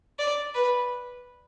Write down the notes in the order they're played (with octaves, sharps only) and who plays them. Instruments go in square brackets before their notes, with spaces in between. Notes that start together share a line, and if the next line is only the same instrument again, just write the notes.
[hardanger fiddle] D5
B4